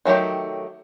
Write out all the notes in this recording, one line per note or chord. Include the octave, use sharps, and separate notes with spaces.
D#3 F#3 A3 G4